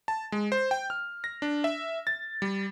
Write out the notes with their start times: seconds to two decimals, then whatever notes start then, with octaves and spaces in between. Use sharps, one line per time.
0.08 A5
0.32 G#3
0.52 C5
0.71 G5
0.90 F6
1.24 A#6
1.42 D4
1.64 E5
2.07 A6
2.42 G3